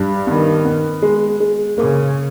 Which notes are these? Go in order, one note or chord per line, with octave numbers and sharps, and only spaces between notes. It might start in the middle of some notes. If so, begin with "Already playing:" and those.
Already playing: G2
D#3 B3
B3
G#3
G#3
C#3 A#3